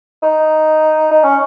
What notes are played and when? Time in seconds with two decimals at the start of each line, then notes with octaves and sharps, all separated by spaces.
0.23 D#4
1.11 D#4
1.24 C#4